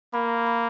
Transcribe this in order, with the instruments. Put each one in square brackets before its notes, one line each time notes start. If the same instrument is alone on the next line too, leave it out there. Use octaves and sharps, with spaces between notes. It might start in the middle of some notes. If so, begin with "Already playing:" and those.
[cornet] A#3 [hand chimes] B5
[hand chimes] B5